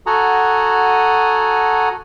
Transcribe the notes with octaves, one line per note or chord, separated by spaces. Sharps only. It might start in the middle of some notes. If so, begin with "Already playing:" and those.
F#4 A4 F#5 G#5 A#5 D#6